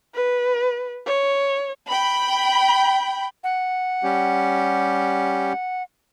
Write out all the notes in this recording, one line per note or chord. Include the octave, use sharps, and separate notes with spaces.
B4
C#5
G5 B5
F#5
G3 C#4 G4